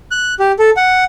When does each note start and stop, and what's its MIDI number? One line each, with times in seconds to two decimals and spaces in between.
0.11 0.35 90
0.40 0.52 67
0.59 0.70 69
0.77 1.04 78